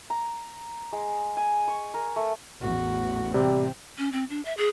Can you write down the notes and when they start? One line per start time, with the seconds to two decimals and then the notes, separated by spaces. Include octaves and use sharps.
0.10 A#5
0.93 G#3
1.37 G#5
1.68 C#6
1.94 A#4
2.16 A3
2.61 A1 E2 F#4
3.34 C3 G3 C4
3.98 C#4
4.12 C4
4.30 D4
4.45 E5
4.58 G#4